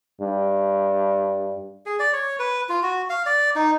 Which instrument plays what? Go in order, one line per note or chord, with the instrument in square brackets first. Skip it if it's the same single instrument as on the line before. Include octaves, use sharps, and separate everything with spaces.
[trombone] G2
[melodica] G#4
D5
C#5
B4
F4
F#4
F5
D5
D#4